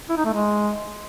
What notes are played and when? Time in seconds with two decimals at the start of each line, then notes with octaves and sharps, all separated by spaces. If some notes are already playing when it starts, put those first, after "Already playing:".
0.09 E4
0.17 D#4
0.25 A3
0.33 G#3